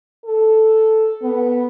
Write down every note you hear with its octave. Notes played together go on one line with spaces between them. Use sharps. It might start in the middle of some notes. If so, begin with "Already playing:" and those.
A4
B3